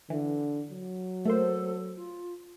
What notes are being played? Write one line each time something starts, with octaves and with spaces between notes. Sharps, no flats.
D3 E3
F#3
A3 A#3 A4 C5
F4